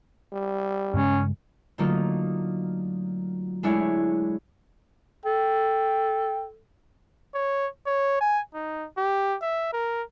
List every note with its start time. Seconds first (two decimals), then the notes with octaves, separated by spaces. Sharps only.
0.33 G3
0.94 G2 C#3 G#3 C#4
1.78 D3 F#3 A3 A#3 D#4 F4
3.63 G#3 A3 D4 E4 C#5 G#5
5.25 A4 G5
7.34 C#5
7.86 C#5
8.21 G#5
8.54 D#4
8.97 G4
9.42 E5
9.73 A#4